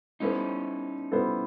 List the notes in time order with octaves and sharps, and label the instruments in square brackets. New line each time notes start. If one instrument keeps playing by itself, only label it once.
[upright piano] G3 B3 E4 A4 C5 [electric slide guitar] C#4 D#4
[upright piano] G3 B3 E4 A4 C5